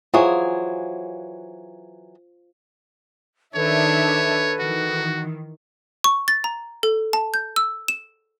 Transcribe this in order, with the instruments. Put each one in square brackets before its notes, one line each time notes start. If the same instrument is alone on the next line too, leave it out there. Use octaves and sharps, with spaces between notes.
[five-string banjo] E3 F#3 G#4 [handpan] F4 C5
[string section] D#3 D4 E5 [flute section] A4 B4 [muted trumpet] C#5
[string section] D#3 E3 [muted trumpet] F#4
[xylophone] C#6
A6
A#5
A4
A5
G6
E6
E7